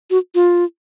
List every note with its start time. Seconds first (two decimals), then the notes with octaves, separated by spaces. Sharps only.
0.10 F#4
0.35 F4